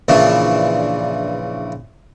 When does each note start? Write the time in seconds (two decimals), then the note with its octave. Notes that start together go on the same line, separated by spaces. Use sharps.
0.08 A#1 C#3 E3 D4